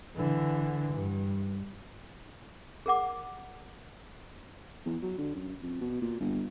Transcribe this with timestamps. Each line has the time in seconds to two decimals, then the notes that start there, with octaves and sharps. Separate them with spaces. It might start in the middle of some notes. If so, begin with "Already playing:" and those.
0.16 D3 E3
0.93 G2
2.86 G#4 A#4 F#5 D6
4.86 E2
5.02 F#3
5.18 D3
5.35 F#2
5.61 F2
5.81 B2
6.01 A#2
6.20 G1